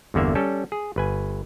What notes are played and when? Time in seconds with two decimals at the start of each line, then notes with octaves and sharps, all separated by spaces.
0.14 G1 E2 D3 A#3 E5
0.35 G3 C#4 A4
0.72 G#4
0.96 G1 B4 G#5